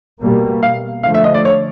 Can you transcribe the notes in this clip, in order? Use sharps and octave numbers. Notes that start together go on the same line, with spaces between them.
B2 G3 A#3
F5
D3 F3 A3 F5
E5
D#5
D5
C#5